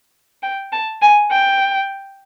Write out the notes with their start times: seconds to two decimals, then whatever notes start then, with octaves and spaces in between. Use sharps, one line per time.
0.43 G5
0.72 A5
1.02 G#5
1.31 G5